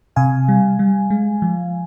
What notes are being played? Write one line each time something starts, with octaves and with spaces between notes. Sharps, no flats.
C3 F5 G#5
G3
G3
G#3
F3